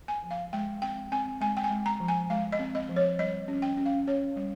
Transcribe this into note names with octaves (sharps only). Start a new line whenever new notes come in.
G#5
F3
F5
G#3 G5
C4 G5
C4 G#5
G#3 G#5
G5
G#5
G#3
A#5
F3
G#5
G#3 F5
D#5
C4
D#5
F3
C#5
G3 D#5
C#4
G5
C#4
F5
C#4 C#5
G3